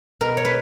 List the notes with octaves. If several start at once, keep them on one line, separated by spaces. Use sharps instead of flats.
B2 A#4
C#5
B4